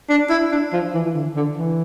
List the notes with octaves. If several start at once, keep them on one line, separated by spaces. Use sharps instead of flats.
D4
E4
D4
F3
E3
E3
D3
D3
E3